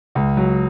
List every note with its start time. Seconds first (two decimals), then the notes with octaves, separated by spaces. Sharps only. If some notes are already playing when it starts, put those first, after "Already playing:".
0.15 C#2
0.37 F#3